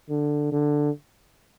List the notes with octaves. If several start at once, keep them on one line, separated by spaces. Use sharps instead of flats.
D3
D3